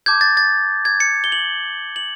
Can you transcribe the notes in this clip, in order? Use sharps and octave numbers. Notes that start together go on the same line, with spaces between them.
A5 D6 G6 G#6
A6
A6
G#6
C#7
G7
F#7
F#7